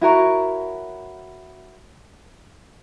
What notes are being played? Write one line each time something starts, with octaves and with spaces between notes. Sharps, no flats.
E4 F#4 A#4 C#5